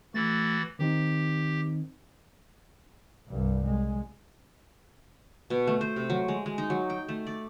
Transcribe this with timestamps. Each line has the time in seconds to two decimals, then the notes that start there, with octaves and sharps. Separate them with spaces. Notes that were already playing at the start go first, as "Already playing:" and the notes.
0.14 E3 A3 F#4 E6 A6
0.79 D#3 C4 D#4 G4
3.28 C2 G2
3.66 G#3
5.50 B2
5.67 A3
5.81 C5
5.96 C3
6.10 F#3
6.28 G#3
6.46 G#3
6.58 D#4
6.70 F#3
6.90 G5
7.08 A3
7.27 D5